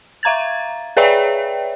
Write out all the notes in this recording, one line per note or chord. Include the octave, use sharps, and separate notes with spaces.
E5 F5 A#5 G#6 A6
G#4 B4 C#5 D5 E5 G5